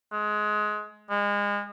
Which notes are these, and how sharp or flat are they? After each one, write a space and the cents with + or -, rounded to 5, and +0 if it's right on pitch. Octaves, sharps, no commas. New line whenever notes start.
G#3 +20
G#3 -30